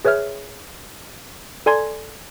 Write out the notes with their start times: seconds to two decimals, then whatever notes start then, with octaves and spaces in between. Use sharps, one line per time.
0.05 G#4 B4 C#5 E5 F6
1.66 A4 D5 G#5 A#5 C6 G#6